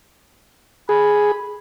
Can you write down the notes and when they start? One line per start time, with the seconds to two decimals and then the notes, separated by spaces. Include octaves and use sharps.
0.89 G#4 B5